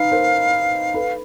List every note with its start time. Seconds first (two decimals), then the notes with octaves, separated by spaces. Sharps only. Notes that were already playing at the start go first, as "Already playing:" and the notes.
Already playing: D#4 B4 F5
0.12 A#4 C5
0.94 A4 B4